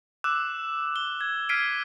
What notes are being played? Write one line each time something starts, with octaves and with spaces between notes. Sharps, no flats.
D6 E6 F#6 E7
G7
G#6
F6 G#6 B6 C7 D7 D#7